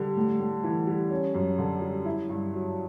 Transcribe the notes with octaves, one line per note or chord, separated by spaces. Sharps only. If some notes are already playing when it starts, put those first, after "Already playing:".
Already playing: D3 G3
A2
A2
E3
G3
C#4
F#2
D3
G3
E4
G2
F#3